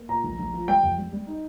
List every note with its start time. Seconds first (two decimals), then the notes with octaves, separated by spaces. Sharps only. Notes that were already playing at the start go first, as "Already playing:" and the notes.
Already playing: A#3
0.09 A#2 A#5
0.24 A#1
0.39 A#1
0.54 F3
0.68 G3 G5
0.83 F2
0.98 G3
1.13 G3
1.27 D#4